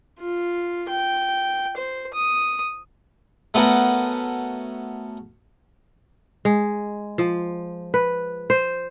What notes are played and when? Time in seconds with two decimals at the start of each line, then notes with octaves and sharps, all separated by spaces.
0.19 F4
0.89 G5
1.77 C5
2.14 D#6
3.54 A3 B3 C#4 F#4 A#4
6.45 G#3
7.18 F3
7.94 B4
8.50 C5